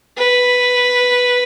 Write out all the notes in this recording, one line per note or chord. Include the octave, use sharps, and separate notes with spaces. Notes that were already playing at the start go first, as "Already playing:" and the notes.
B4